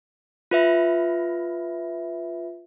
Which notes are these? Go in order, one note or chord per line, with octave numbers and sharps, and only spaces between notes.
F4 B4 E5